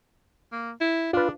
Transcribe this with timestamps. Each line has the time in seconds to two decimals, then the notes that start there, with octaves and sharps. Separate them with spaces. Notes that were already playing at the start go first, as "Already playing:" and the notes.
0.52 A#3
0.81 E4
1.13 D4 F4 B4